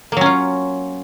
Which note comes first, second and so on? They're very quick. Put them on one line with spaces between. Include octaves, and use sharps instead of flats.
A#3 F#3 C#4 F4